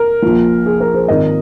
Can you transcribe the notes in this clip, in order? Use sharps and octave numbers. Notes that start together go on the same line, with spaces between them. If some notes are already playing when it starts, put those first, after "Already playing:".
Already playing: A#4
A#1 A#2 F3
G#4
A#4
G#4 C5
G#1 G#2 F3 A#4 D#5